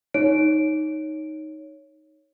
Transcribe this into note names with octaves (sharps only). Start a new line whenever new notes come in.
D#4 C#5 D7